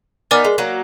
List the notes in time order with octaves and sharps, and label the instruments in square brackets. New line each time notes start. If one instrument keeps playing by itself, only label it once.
[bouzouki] B3 D#4 [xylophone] A#4 D5 G#5 D6 F6
[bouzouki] G#3
F#3 A#3